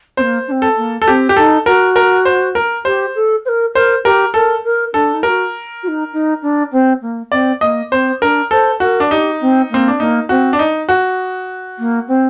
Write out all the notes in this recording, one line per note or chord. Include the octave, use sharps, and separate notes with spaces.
A#3 C4 C5
D4
C4
A4
A#3
A4
C4 G4
G4
D#4 A4
F#4 A#4
A#4
C5
A#4
G4 C5
A4
C5
A#4
A#4 C5
G4 A#4
A4 A#4
A#4
D4 A4
D#4
F#4 G4 A#4
F#4
D#4
D#4
D4
C4
A#3
C4 D5
A#3 D#5
C4 C5
D4 A#4
A4 C5
F#4 A#4
D4
D#4 G4
C4
A#3 C4
D4
A#3 D#4
C4 F#4
D4
D#4
F#4
A#3
C4